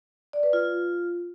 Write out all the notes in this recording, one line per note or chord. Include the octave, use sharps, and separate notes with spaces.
D5
B4
F4